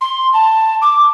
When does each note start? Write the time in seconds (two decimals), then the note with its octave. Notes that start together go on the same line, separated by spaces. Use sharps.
0.01 C6
0.33 A5
0.81 D6